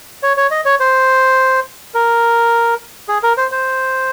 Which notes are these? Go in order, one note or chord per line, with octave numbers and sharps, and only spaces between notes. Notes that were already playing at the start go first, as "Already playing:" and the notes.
C#5
C#5
D#5
C#5
C5
A#4
G#4
A#4
C5
C5